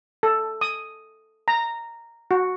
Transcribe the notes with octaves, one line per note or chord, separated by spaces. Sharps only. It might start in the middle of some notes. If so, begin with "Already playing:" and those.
A4
D#6
A#5
F#4